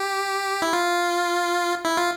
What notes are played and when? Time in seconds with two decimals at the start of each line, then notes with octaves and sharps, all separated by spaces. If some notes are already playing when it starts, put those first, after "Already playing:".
Already playing: G4
0.62 E4
0.73 F4
1.85 E4
1.97 F4